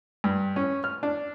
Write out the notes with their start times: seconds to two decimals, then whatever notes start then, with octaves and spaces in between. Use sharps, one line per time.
0.24 G2
0.56 C#4
0.84 F6
1.03 D4